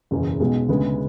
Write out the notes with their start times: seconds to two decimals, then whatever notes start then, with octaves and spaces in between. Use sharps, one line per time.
0.11 F#1 E2 B2
0.40 B1 B2 G#3
0.69 D2 C#3 G#3 B3